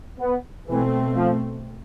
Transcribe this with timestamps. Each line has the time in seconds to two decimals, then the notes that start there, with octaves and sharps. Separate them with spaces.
0.19 B3
0.67 B2 E3 A3 C4
1.15 F3